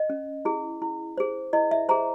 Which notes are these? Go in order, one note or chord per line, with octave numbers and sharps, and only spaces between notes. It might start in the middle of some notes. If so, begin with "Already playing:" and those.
Already playing: D#5
C#4
E4 G#4
E4
G#4 C5
E4 D#5
E5
G#4 C5 A#5